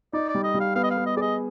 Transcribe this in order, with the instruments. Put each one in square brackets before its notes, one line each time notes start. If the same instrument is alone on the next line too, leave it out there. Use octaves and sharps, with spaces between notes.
[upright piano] D#4 [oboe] D5
[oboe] D5
[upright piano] G3
[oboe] D#5
[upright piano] G3
[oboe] F5
[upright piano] B3 [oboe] F5
[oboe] D#5
F5
[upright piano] B3
[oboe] D#5
[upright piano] G#4 [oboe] D5
[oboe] D#5